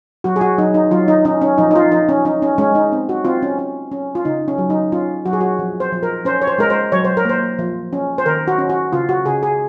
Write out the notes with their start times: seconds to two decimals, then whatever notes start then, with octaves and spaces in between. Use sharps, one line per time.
0.24 F#3 F#4
0.36 G#4
0.41 F#4
0.58 F#3 D#4
0.74 D#4
0.91 F#3 F4
1.08 D#4
1.25 C#4 D#4
1.41 C#4
1.58 F3 D#4
1.71 D#4
1.76 F4
1.91 F3 D#4
2.09 C#4
2.25 C#4 D#4
2.42 C#4
2.58 G#3 C#4
2.75 D#4
2.92 C4
3.09 F#4
3.25 C4 F4
3.42 C#4
3.59 C#4
3.91 C#4
4.15 F4
4.25 C#3 D#4
4.48 C#4
4.58 F#3
4.70 D#4
4.92 C#4 F4
5.26 F#3 F#4
5.33 G#4
5.41 F#4
5.59 F3
5.80 C5
5.92 F3
6.03 A#4
6.25 C#4 C5
6.42 C#5
6.47 C5
6.58 G#3 A#4
6.70 C5
6.92 F#3 C#5
7.04 C5
7.17 A#4
7.25 A#3 C5
7.59 F3
7.93 C#4
8.18 C5
8.26 D#3 A#4
8.48 F#4
8.58 C#4
8.69 F#4
8.93 C#3 F4
9.09 F#4
9.26 C#3 G#4
9.43 G#4